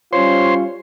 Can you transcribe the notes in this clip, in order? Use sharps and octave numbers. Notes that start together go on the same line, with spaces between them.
G3 C#4 F4 C5 C#5 C6